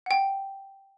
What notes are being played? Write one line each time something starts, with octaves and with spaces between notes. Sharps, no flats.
F#5 G5